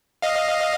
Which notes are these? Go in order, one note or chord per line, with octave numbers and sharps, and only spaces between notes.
D#5 F5